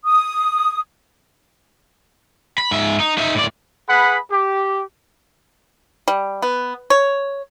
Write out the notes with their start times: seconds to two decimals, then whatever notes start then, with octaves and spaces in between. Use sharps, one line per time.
0.05 D#6
2.58 B5
2.71 G#2 E5
3.00 D#4
3.18 D#4 E5
3.35 A2 D5
3.89 G#4 B4 F#5 B5
4.31 G4
6.08 G3
6.42 B3
6.90 C#5